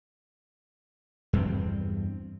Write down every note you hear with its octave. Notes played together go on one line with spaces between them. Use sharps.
E2 G2 A#3 C4